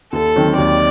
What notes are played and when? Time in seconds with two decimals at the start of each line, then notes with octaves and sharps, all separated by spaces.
0.13 D#2 A4
0.35 D#3 F#3 C4
0.58 D#2 D5